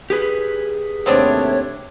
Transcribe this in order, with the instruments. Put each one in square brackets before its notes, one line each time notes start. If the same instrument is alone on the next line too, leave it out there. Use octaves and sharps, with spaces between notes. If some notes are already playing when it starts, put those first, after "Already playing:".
[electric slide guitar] G4 G#4 B4
[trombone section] D#2 C3 A3 [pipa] B3 C4 D4 [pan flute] C#5